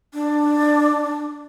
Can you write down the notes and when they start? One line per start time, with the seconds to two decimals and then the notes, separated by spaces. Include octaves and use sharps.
0.14 D4